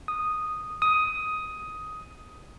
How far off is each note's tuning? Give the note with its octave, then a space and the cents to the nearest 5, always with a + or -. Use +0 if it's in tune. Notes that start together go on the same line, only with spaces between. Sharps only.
D#6 -5
D#6 +10